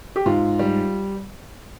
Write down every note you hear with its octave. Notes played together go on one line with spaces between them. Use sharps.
G4
G#2 F4
G3